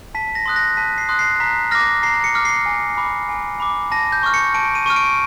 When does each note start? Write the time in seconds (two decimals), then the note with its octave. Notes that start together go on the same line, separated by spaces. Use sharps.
0.15 A5 B6
0.35 A#6
0.46 C6 D#6 F#6
0.56 A#6
0.77 A5 B6
0.98 C7
1.09 C6 D#6 F#6
1.19 C7
1.40 A#5 B6
1.71 D6 F6 A#6
2.03 A#5 C7
2.24 C#7
2.35 D6 F6
2.45 C7
2.66 G#5
2.97 B5 D6
3.29 G#5
3.60 B5 D6
3.92 A5 A#6
4.12 G6
4.23 C#6 F6
4.34 C#7
4.54 A5 D7
4.75 D#7
4.86 C#6 F6 D#7
4.96 D7